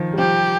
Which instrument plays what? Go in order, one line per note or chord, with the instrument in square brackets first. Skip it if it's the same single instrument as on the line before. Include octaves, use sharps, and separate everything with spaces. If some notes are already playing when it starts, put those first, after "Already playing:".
Already playing: [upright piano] D#3 F3
G3
[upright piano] F3 [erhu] G4